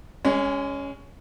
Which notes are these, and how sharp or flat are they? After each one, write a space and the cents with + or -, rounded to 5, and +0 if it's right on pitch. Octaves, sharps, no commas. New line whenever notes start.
G#3 -25 C#4 +10